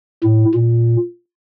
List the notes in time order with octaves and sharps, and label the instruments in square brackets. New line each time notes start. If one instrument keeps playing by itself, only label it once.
[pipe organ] A2
A#2